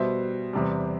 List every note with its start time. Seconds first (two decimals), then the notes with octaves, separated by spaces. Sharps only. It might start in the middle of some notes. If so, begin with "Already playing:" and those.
Already playing: B2 G3 C5 E5
0.53 E2 C3 G3